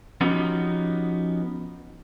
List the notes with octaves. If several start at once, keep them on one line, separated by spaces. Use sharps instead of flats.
F3 B3 C#4 D#4 F#4 G4